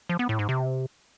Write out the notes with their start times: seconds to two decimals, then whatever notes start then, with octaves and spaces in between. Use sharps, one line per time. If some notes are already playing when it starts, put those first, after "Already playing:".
0.09 F3
0.19 B3
0.29 A2
0.39 G#2
0.49 C3